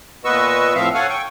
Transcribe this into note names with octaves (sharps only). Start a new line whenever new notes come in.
A#2 B3 B4 D#5 C#6 E6
A2 F3 C4 E5 F5
A4 C#5 F5 F#5 G#5
G5 C#6